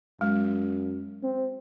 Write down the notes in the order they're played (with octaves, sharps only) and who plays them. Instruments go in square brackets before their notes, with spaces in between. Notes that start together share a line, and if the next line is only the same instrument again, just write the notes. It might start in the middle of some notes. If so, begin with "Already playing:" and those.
[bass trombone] F#2 [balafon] G#3
[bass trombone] C4